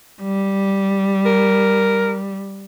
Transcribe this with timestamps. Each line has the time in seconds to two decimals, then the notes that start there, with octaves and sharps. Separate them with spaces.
0.23 G3
1.25 A#4